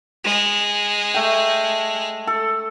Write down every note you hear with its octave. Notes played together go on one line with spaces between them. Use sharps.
G#3
A3 G5
A4